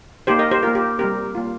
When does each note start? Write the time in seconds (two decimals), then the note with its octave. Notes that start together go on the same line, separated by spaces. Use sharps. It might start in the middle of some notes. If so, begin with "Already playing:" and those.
0.27 A#3 D#4 G4 C5
0.39 A#4 D#5
0.51 G4 C5
0.63 A#3 F4 A#4
0.75 G4
0.99 G3 C4 G4 A#4
1.35 A#3 F4